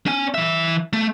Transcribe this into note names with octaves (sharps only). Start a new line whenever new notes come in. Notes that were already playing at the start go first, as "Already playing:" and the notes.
C#4 G#5
E3 E5
A3